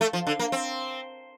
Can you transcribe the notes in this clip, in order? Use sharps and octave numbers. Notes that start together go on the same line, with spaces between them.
A3
F3
D3
A#3
C4